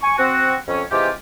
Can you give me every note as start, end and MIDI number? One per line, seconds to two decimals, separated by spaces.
0.02 0.16 80
0.02 0.16 85
0.18 0.55 60
0.18 0.55 66
0.68 0.83 41
0.68 0.83 61
0.91 1.10 48
0.91 1.10 52
0.91 1.10 56
0.91 1.10 65
0.91 1.10 67